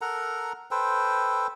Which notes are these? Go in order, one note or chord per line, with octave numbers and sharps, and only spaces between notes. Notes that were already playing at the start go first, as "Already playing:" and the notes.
A4 A#4 F#5 A#5
A4 B4 C5 G5